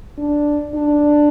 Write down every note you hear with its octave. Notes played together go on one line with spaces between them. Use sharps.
D4
D4